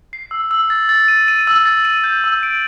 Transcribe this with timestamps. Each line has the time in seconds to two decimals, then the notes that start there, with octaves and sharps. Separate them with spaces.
0.13 C7
0.31 E6
0.51 E6
0.70 A6
0.89 A6
1.08 D#7
1.28 D#7
1.47 E6
1.66 A6
1.85 D#7
2.04 G6
2.24 E6
2.43 D7